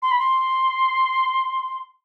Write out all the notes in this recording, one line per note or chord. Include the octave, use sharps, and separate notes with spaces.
C6
B5
C6